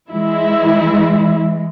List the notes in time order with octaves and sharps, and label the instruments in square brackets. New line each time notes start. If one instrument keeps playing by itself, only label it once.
[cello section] E3 G#3 [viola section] E4